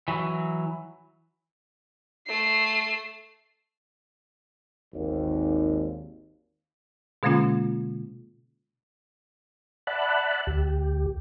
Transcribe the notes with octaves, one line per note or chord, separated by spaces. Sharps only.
E3 F#3
A3 C7
G#1 D#2
B2 D3 G#3 A#3 C#4 F4
D5 E5 F#5 A5 B5 F#6
D2 G4